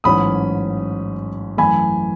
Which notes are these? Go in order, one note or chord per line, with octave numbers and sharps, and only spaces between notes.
A1 G#2 F#3 C#4 B5 D#6
F#2 E3 A3 G#5 B5